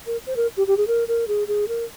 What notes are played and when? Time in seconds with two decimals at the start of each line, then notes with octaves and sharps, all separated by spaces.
0.06 A#4
0.26 C5
0.36 A#4
0.57 G4
0.67 G4
0.77 G#4
0.87 A#4
1.08 A#4
1.28 G#4
1.48 G#4
1.68 A#4